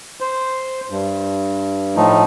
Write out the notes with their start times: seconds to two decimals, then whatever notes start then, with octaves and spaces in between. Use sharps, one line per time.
0.20 C5
0.90 G2
1.96 A2 F3 A3 D#4